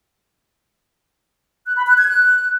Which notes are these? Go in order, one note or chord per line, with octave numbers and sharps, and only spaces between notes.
F#6
B5
F#6
G#6
F#6